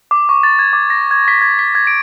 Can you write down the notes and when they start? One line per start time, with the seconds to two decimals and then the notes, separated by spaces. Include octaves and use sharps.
0.11 D6
0.29 C#6
0.43 A6
0.59 G#6
0.73 D6
0.90 A#6
1.11 G#6
1.28 B6
1.42 G#6
1.59 B6
1.75 G#6
1.87 D7